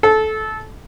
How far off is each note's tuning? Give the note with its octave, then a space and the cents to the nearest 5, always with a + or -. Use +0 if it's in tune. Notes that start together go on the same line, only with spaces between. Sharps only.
A4 -20